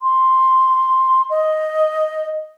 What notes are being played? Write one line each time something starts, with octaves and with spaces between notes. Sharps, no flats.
C6
D#5